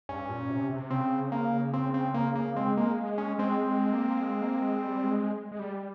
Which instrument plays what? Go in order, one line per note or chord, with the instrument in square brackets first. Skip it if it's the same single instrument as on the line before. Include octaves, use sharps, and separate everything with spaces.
[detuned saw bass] G2 [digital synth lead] C#4
[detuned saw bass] A#2
C3
C3
[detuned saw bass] C#3 [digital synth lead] C4
[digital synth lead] A#3
C4
C4
A#3
A#3
[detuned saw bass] G#3 [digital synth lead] C4
[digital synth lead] A#3
C#4
[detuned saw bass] G#3 [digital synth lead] C4
[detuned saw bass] G#3
A#3
G#3
A#3
G#3
G3
G#3
G#3
G3